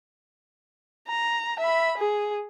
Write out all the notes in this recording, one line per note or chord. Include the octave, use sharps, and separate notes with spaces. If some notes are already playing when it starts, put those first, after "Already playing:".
A#5
E5 B5
G#4